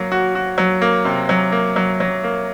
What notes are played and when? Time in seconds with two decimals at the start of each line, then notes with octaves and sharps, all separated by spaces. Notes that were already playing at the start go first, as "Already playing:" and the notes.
Already playing: F#3 A#3
0.12 F#4
0.35 F#4
0.58 F#3
0.82 A#3
1.05 C3
1.29 F#3
1.52 A#3
1.76 F#3
2.00 F#3
2.24 A#3